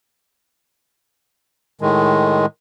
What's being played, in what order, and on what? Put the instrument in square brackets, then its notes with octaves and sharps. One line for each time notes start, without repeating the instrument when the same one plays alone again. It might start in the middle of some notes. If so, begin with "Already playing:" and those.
[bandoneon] A2 D#3 G#3